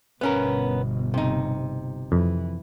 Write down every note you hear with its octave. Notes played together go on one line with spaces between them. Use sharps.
G1 B2 B3 C#4 A#4
C3 D#4
F2 E3